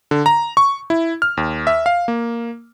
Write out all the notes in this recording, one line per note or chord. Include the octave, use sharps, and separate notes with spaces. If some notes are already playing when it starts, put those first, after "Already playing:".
D3
A#5
C#6
E4
F6
D#2
E5
F5
A#3